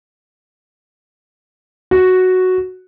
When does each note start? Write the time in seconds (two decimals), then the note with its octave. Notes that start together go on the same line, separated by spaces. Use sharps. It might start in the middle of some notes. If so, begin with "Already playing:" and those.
1.91 F#4